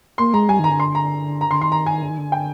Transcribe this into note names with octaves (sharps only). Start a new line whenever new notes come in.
A#3 C6
G#3 A#5
G3 G#5
D#3 A#5
D3
C6
A#5
A#5
D3 C6
D#3 C6
A#5
G#5
D3
D#3
D3
G5